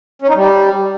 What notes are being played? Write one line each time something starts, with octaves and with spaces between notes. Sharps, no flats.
C#4
D#4
G3